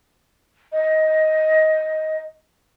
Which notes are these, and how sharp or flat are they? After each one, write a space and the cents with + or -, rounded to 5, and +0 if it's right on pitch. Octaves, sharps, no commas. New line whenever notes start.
D#5 +10